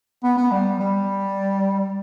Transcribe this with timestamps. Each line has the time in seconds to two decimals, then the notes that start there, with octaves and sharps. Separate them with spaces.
0.23 B3
0.38 B3
0.51 G3
0.80 G3